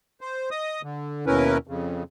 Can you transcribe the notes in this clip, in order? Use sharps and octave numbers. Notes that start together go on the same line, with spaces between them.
C5
D#5 D#6
D3
D#2 B2 C#4 E4 A#4 B4
F2 C#3